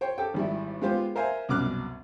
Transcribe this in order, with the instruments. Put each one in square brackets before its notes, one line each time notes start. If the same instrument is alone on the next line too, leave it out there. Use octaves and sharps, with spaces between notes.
[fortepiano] C5 C#5 G5
G4 A4 G5
G#1 G3 E4
G#3 B3 F4 G4 C5
A#4 C5 E5 F5 G#5
C2 F#2 B2 D6 F6 F#6